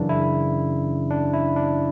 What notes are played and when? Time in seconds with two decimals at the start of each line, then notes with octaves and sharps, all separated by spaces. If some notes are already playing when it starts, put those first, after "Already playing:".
Already playing: F#2 C#3 E3 D4
0.09 E4
1.11 D4
1.34 E4
1.56 D4